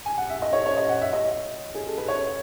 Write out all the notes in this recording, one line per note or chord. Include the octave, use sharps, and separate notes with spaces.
G#5
F#5
E5
D#5
C#5
C#5
D#5
F#5
E5
D#5
G#4
A4
B4
C#5